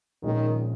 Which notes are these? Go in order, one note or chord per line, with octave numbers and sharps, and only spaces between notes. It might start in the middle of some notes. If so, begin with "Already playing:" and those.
A#1 A#2 D#3 F3 G#3 C#4